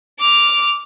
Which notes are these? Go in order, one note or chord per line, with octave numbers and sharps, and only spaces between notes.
D6 F6